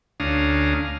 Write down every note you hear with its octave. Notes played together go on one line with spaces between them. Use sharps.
D2 C#4 D4 F5 A#5 D#6